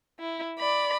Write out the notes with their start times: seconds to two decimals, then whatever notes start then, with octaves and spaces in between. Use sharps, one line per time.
0.20 E4
0.59 D5 B5